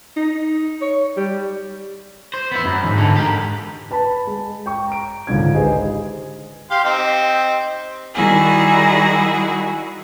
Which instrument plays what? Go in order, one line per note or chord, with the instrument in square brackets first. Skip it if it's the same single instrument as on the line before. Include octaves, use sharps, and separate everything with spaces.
[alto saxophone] D#4
C#5
G3
[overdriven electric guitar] C5
B3 E4
F#2
D#2 G#2
G#2 D3
G4 A#4
[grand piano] B4 A5 B5
G#3
G5 C#6
A#5 D7
G#1 C#2 D3 G#6
D#4 G4 G#4 B4 C5 D#5
[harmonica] G4 F5 C6
C4 D#4 G4
[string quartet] D#3 G3 E4 F#4 G#4